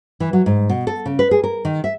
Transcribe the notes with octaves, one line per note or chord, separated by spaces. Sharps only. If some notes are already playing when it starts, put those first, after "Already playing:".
E3
F#3
G#2
B2
A4
C#3
B4
G#4
A#4
D#3
E5